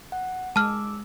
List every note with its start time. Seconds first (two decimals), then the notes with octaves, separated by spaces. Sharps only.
0.12 F#5
0.56 G#3 A5 D6 E6 F6